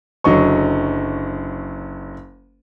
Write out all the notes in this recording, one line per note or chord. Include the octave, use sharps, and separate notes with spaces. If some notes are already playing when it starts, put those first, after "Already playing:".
F#1 D3 F#3 D#5 C#6